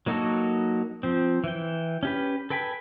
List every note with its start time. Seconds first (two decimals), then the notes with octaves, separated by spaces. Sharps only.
0.06 F#3 A#3 D#4 F#4 A4
1.03 F3 C4
1.44 E3 G5
2.03 C#4 G4 B4
2.50 A4 B4 G5 G#5 B5